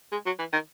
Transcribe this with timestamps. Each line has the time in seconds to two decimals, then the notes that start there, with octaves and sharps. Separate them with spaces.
0.12 G#3
0.26 F#3
0.39 E3
0.53 D#3